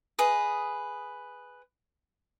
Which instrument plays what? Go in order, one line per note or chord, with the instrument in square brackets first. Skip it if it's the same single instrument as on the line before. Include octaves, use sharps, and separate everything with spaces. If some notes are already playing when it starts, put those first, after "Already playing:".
[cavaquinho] G#4 B4 D#5